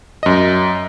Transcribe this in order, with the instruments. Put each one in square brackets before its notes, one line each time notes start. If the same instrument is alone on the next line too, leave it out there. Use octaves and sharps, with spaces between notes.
[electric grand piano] F#2 D#5